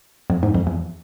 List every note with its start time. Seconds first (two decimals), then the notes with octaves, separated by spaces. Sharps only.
0.30 F2
0.43 G#2
0.54 F2
0.67 E2